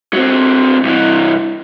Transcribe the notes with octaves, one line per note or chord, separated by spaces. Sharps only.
F#3 C4
C2 E3